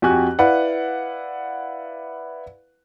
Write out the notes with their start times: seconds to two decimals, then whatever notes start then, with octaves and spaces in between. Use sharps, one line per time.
0.02 F2 F#4 G4 G#5 F#6
0.39 E4 B4 D5 F5 F#5